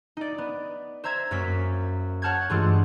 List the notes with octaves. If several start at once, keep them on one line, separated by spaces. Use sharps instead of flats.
D#4 D5
B3
C5 E5 A#5 G#6
F#2 A#3 C#4 B6
C#5 F#5 A5 F6 G6 G#6
G2 E3 G#3 A3 D4 F4